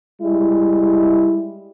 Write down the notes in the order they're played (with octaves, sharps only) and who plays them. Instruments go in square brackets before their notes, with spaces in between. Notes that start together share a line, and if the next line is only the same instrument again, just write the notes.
[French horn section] G3 G#3 E4